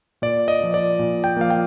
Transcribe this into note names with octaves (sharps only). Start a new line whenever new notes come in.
A#2 D5
D#5
F3 A#3
D5
A#2
G5
F3 A#3 F5
G5